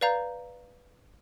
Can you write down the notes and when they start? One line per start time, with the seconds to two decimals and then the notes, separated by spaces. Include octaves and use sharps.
0.01 B4 D5 F5 A#5 G6